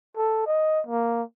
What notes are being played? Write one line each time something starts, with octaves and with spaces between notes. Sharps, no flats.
A4
D#5
A#3